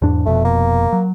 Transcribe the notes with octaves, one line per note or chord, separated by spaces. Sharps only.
E2 G#2 D4
F1 F2 B2 A3
A#3
F#3